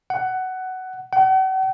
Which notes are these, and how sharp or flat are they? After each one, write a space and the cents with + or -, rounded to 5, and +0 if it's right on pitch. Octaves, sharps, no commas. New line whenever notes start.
F#5 +15
F#5 +45